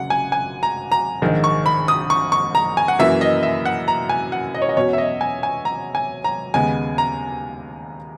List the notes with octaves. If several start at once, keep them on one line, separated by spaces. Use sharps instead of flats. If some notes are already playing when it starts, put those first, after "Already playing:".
Already playing: F#1 F#2 C#3 F#5
G#5
G#5
A#5
A#5
A#1 G#2 D#3 G#3
C#6
B5
D#6
C#6
C#6
A#5
G#5
F#5
F#2 E3 A#3 E5
D#5
E5
F#5
A#5
G#5
F#5
D#5
C#5
D#5
E2 B2 F#3 C#4 C#5
E5
D#5
G#5
G#5
A#5
G#5
A#5
D#2 C#3 G#3 B3 G#5
A#5